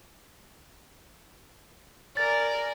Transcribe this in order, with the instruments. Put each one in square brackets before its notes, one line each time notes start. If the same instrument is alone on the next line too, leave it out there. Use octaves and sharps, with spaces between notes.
[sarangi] A#4 [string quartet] D5 G#5 [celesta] A6